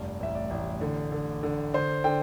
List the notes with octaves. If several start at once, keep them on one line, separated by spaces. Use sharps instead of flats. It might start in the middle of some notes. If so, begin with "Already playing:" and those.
Already playing: F1 G2
A1 E5
D5
A1
D3
D3
D3
D3 C5
D3 G5